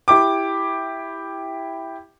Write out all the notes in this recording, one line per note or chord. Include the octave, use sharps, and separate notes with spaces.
E4 G4 D6